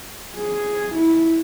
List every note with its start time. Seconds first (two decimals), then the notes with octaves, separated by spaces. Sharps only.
0.36 G#4
0.95 E4